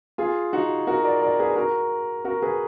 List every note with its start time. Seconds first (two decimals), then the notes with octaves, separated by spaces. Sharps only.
0.18 F4 G#4
0.53 D#4 F#4
0.87 F#4 A#4
1.04 A#4 D5
1.22 A#4 D5
1.39 G#4 B4
1.56 F#4 A#4
2.25 F#4 A#4
2.42 G#4 B4